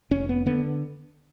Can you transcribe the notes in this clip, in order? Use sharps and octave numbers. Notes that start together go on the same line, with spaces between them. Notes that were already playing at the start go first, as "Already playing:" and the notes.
F1 C#4
B3
D3 B3